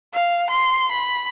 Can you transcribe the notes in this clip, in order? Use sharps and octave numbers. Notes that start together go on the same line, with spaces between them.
F5
C6
B5